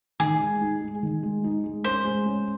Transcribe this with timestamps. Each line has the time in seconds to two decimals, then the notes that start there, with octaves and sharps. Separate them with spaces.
0.20 D#3 G#4
0.40 G#3
0.61 D#4
0.81 G#3
1.03 D#3
1.23 G#3
1.44 D#4
1.64 G#3
1.84 C#4 C5
2.05 G#3
2.26 C#4